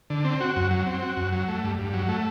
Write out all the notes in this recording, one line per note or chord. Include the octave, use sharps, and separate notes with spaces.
D3
C4
F#4
F#2
F#3
C4
F#4
F#2
F#3
A3
G2
G2
F#3
A3